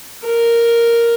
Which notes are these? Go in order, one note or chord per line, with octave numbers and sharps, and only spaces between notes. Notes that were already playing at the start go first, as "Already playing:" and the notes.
A#4